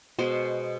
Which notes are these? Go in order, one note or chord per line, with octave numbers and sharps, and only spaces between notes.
B2 G#3 B3 C5